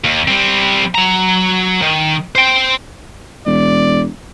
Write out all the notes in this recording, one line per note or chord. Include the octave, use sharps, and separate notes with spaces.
D#2
G3 C4
F#3 A#5
D#3
C5 G5
E1 D5